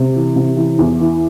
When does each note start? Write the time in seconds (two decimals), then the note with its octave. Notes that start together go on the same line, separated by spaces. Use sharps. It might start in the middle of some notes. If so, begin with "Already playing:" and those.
Already playing: C3
0.15 E3
0.36 C3
0.57 E3
0.79 E2
1.00 E3